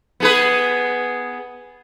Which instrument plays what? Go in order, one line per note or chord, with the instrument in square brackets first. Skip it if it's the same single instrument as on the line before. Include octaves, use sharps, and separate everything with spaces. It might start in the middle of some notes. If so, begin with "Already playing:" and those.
[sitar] B3 G#4 B4